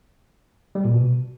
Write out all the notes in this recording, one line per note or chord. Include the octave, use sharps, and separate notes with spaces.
G3
A#2
B2